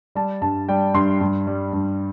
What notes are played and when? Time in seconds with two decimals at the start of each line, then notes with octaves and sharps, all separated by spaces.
0.15 G3 A5
0.42 G2 A5
0.69 G3 G5
0.94 G2 C6
1.21 G2
1.47 G3
1.73 G2